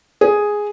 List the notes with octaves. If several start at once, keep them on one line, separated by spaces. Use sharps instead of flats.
G#4